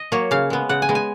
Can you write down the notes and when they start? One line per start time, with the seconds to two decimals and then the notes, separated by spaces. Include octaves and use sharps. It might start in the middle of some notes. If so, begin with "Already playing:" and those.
Already playing: D#5
0.12 F#3 A#3 C#5
0.31 C#3 F5
0.50 G#3 B3
0.69 C#3 F#5
0.82 G#5
0.89 G#3 B3
0.95 G#5